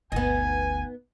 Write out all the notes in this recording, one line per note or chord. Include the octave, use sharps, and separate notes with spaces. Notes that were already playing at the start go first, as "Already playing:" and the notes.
G1 D2 B3 D#4 G#5